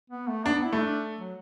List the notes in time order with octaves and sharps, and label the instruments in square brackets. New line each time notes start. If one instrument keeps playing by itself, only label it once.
[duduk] B3
A3
[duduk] B3 [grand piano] D4
[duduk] E4
[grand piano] A3
[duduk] D4
F#3